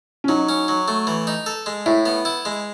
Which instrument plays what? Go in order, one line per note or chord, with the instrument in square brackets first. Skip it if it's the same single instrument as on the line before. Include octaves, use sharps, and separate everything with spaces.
[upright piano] C#4
[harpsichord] F#3 [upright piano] D#4
[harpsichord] C#4
F#3
A3
E3
D#4
A4
G#3
[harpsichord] A2 [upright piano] E4
[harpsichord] B3
E4
G#3